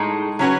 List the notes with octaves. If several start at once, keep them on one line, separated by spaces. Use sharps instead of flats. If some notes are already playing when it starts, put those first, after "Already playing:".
Already playing: A2 G#3 D#4
F#3 C#4 F#4 B4